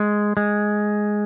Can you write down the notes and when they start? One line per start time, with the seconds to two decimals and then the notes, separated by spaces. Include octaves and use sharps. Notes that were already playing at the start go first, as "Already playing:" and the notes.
Already playing: G#3
0.37 G#3